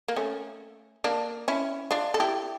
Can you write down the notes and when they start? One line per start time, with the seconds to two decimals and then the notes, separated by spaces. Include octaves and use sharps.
0.08 A#3
0.16 A3 C#4
1.04 A#3 D4
1.48 C#4 E4
1.91 D4 F4
2.14 A4
2.20 E4 G4